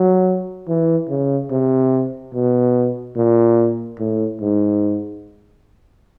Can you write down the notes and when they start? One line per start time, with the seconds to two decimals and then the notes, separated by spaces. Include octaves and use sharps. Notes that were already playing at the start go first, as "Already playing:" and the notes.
Already playing: F#3
0.68 E3
1.09 C#3
1.51 C3
2.33 B2
3.16 A#2
3.99 A2
4.41 G#2